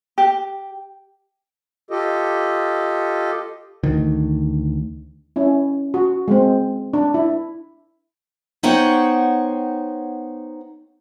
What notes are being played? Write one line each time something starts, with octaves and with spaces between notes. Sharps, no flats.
G4
F4 G4 A4 D#5
D2 D#3
C#4 E4
F#4
G#3 C4
D4
E4
B3 D#4 C5 C#5 F#5 G5